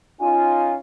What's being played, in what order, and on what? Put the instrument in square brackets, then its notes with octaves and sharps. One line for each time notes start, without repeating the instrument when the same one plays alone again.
[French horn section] C#4 D#4 F4 [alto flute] G#5